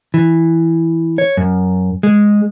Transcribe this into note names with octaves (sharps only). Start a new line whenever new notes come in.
E3
C#5
F#2
G#3